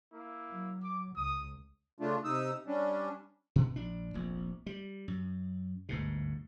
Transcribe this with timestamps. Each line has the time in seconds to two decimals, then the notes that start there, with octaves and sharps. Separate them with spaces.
0.11 A#3 E4
0.51 F#3
0.83 D6
1.16 C#2 D#6
2.00 C#3 A3 D4 F4
2.24 C3 D#4 D#6 E6
2.67 G3 C#4 D4
3.56 B2
3.76 A#1 D4
4.14 F1 A#1
4.66 G3
5.08 F#2
5.89 G1 D2 G#2 B2